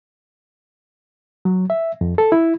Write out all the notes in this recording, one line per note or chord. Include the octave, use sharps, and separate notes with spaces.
F#3
E5
F2
A4
E4